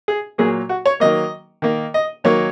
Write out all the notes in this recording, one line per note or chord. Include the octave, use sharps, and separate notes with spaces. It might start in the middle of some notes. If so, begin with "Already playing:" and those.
G#4
A#2 F#3 A#3 G#4
F#4
C#5
D#3 F#3 A#3 D#5
D#3 A#3
D#5
D#3 F#3 A#3 C#5